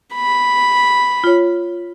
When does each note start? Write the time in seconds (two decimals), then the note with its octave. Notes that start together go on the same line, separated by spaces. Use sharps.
0.15 B5
1.24 F4 C#5